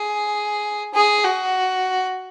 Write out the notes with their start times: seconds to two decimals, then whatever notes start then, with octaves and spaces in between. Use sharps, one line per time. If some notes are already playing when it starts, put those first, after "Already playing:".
Already playing: G#4
0.94 G#4
1.24 F#4